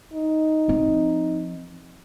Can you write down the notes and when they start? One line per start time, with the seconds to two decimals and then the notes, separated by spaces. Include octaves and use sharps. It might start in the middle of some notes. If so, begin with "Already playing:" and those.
0.13 D#4
0.68 F3 C4